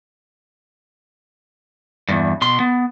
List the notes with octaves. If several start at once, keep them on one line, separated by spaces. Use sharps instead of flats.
E2 G2
B2 C6
B3